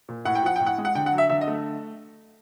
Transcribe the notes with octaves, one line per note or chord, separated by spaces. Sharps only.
A#2
A2 F#5
G5
F3 F#5
A2 G5
F#5
G#3
F#5
D3 G5
F#5
F#3
E5
D3 E5
D#5
A3